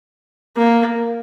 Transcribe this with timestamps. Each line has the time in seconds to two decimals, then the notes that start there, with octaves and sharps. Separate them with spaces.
0.57 A#3